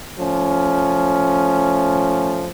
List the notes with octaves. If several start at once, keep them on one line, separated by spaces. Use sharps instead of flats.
F3 A3 C#4